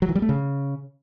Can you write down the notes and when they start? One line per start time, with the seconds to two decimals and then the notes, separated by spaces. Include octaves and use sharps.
0.02 F#3
0.09 E3
0.15 G3
0.22 A3
0.29 C#3